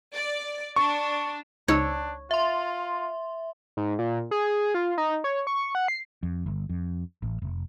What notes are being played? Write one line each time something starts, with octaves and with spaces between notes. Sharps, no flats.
D5
D4 C#6
C#2 D4 D#4 C#5 E6
F4 E5 C6
G#2
A#2
G#4
F4
D#4
C#5
C#6
F#5
C7
F2
G1
F2
A1
F1